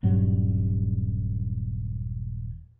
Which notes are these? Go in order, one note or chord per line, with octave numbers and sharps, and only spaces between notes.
D#1 G2 F#3